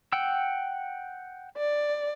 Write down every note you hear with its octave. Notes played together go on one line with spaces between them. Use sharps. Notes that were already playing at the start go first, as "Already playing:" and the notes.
F#5 G5 E6
D5